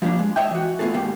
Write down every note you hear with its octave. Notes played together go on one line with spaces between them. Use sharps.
F3 G3 G#3 A#3 D4
G#3
C#5 D#5 E5 G5
E3 F#4
A3 B3 F4 G#4 A4
D#2 G#2 A#3 G4